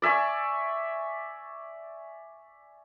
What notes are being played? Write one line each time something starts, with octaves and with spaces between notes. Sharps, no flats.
D5 E5 G#5 C#6